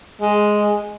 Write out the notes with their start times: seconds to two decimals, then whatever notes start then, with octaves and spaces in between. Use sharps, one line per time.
0.21 G#3